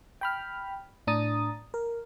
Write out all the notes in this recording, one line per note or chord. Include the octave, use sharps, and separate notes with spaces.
G5 B5 F6
A2 D4 A#5 D#6 A6
A#4